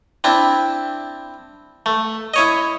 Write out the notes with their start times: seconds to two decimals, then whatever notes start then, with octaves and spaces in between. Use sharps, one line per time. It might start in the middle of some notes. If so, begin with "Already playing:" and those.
0.24 C4 D4 E4
1.86 A3
2.34 E4 C#5 D#5